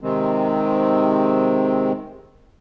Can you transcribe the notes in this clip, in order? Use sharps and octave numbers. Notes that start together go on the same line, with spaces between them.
C3 D#3 G#3 C4